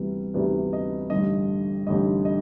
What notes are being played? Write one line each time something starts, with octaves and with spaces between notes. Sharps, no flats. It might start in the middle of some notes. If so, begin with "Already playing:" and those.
Already playing: D2 C3 E3 G3 B3
D2 C3 E3 G3 B3 D5
D#5
A1 G2 D3 G3 D#5
A1 G2 D3 G3 D#5
D#5